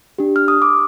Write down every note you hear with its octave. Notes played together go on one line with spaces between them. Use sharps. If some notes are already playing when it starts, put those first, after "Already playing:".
D4 G4
F6
D#6
D6